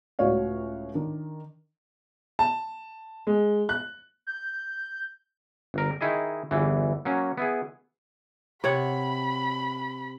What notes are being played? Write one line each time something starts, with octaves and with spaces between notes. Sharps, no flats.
C#2 A2 F#4 C#5 F5
D#3 D4
A5
G#3
F#6
G6
G1 A#4
D#3 D#4 E4 G#4 D#5
G1 E2 E3
F#3 A#3 C#4
B3 E4 G#4
C3 C#5 F#5 B5